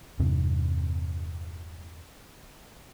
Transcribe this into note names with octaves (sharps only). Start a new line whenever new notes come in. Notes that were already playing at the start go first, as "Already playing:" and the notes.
E2 G2 C3 C4